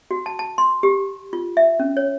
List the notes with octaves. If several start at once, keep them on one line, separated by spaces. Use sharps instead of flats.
F#4
A5
A5
C6
G4
F4
E5
C#4
C#5